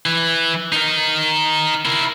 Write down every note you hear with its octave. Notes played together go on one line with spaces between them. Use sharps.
E3
D#4 A#4
E4 A#4